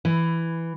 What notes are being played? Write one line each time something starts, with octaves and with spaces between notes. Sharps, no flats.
E3